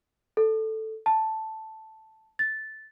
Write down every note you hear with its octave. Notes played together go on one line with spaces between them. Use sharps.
A4
A5
A6